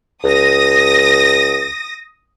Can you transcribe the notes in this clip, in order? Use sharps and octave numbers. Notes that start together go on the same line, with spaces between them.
C#2 D#6 A#6